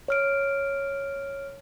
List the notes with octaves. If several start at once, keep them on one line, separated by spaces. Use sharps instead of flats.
C#5 F6 D7